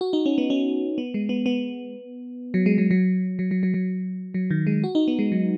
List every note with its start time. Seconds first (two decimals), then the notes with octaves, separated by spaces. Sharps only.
0.01 F#4
0.13 D#4
0.26 C#4
0.38 B3
0.50 C#4
0.98 B3
1.14 G#3
1.29 B3
1.46 B3
2.54 F#3
2.66 G#3
2.78 F#3
2.91 F#3
3.39 F#3
3.51 F#3
3.63 F#3
3.74 F#3
4.34 F#3
4.51 D#3
4.67 G#3
4.84 F#4
4.95 D#4
5.08 B3
5.19 G#3
5.32 F#3